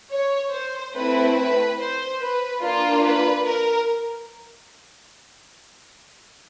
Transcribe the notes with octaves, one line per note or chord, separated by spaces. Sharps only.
C#5
C5
A3 C4 E4 B4
B4
C5
B4
A#3 D4 F4
B4
A#4